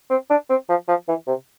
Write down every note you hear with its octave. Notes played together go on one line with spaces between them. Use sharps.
C4
D4
C4
F3
F3
E3
C3